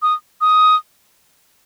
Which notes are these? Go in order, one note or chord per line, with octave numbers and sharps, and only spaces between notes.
D#6
D#6